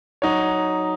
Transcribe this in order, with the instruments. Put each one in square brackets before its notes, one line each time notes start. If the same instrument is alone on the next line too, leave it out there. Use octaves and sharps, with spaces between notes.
[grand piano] F#3 D#4 F#4 C#5